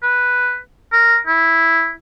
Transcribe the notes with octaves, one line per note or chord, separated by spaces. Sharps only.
B4
A#4
E4